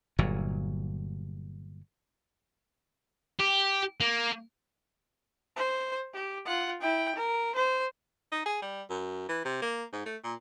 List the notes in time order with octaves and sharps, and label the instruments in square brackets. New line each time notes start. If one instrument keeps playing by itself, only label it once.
[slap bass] G1 A#2 F#3
[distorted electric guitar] G4
A#3
[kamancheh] C5
G4
F4 F#5
E4 G5
A#4
C5
[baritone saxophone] D#4
G#4
G3
F#2
E3
C3
A#3
G#2
A3
A#2